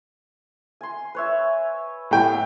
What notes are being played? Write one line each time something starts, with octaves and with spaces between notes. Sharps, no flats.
G#5 C6
B4 C#5 E5
A2 G4 G5